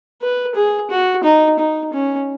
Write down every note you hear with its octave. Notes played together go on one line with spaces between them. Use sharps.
B4
G#4
F#4
D#4
D#4
C#4